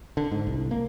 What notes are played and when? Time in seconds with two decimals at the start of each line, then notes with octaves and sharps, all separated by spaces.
0.17 D3
0.32 G#2
0.47 C2
0.71 A#3